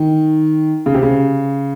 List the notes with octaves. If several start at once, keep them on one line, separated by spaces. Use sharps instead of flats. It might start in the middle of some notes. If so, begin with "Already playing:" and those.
Already playing: D#3
C#3
C3
C#3